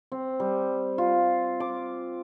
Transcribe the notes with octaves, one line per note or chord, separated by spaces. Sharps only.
C4
G3
F4
D6